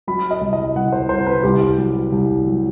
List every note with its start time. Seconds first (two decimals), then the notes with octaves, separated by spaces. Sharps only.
0.07 F#3 B5
0.31 D#5
0.41 C2
0.53 D#5
0.75 C2 F#5
0.92 C5
1.09 C2 C5
1.27 B4
1.43 C2 G4
1.78 F#3
2.12 C2
2.46 F#3